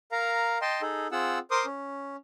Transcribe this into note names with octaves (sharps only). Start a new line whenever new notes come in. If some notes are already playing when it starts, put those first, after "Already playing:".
A#4 F5 A#5
D#5 G5 A5 C6
D#4 G#4 A4
C4 F4 G#4 F#5 E6
A#4 C5 C6 D6 D#6
C#4